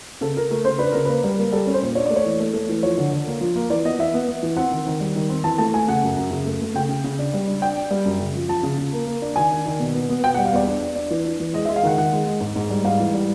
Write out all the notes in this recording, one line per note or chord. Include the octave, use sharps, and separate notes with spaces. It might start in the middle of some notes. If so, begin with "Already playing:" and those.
C#3 A4
C#3 A#4
A3 A#4
C#3 C5
D4 B4
C#3 A#4
A#3 B4
G3
A#3
G3 A4
C#4
C5
A#2
D4 C#5
A3 D5
C#5
E3
A3
A3
E3
F3 C#5
D3
D3
A#3
F3
A#3
E3 D5
B3 D#5
E3 E5
B3
B3
E3
C4 F#5
D#3
D#3
G3
D#3
C4
E3 A5
A3 A5
A3 G#5
C#3 F#5
F#2
F#2
C#3
A3
A3
C#3 G5
C#3
C#3
D4
G3
D4
D4 G5
D4
G3
F#2
C#3
F3
F3 A5
C#3
C#3
A#3
A#3
D4
D#3 G#5
D4
D#3
B2
B3
B3
B2 G5
F#5
G3
F5
E2 D5
D4 D5
D4
D4
E3
D4
E3
G#3 D#5
E5
G#3
F5
D#3 F#5
D#3 F#5
G#3
G#3
G#2
G#2
G3
G#2 F5
E3
G3